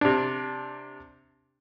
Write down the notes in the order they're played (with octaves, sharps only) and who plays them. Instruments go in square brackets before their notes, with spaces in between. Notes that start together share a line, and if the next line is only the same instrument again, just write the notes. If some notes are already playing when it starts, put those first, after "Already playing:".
[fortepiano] C3 D4